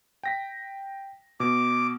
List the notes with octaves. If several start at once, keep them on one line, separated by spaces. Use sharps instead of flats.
G5 A#6 B6
B2 D6